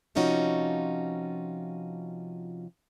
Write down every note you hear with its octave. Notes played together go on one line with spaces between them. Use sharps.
C3 F3 C#4 D#4 F4 F#4